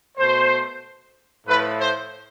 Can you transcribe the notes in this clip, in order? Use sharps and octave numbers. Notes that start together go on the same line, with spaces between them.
B2 A3 C5
A2 F3 A3 B4
C5